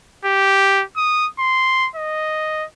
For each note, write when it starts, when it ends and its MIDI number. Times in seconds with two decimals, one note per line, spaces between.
0.25 0.83 67
0.97 1.27 87
1.39 1.88 84
1.96 2.65 75